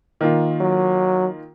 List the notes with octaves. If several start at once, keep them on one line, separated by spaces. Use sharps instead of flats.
D#3 A#3 F4
F#3